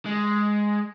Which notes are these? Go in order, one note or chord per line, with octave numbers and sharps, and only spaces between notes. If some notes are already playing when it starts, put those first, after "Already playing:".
G#3